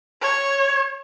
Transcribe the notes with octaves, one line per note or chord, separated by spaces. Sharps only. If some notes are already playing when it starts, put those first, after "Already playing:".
C#5